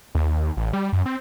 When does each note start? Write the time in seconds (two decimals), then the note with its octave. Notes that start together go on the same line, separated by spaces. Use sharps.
0.15 D#2
0.57 A1
0.73 G3
0.93 F#2
1.06 C4